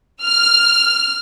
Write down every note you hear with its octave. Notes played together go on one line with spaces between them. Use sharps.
F6